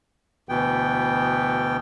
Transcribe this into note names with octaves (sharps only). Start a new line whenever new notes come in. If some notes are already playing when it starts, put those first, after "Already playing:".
D2 B2 E3 B3 G5